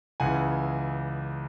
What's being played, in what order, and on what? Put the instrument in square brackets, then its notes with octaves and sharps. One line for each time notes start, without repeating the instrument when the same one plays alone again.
[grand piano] C#2 C#3 E3 F#5 G#5